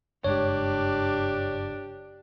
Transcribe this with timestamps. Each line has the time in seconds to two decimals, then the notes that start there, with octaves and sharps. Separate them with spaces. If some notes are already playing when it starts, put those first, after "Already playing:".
0.24 F#1 G2 G#3 D4 G4 C#5